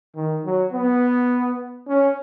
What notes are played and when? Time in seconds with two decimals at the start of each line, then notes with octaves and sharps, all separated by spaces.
0.15 D#3
0.45 F#3
0.73 B3
1.88 C#4